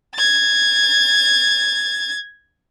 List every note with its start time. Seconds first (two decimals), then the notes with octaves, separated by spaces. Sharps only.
0.15 G#6 A6